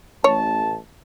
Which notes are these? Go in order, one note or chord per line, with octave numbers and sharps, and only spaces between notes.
A1 C#5 A5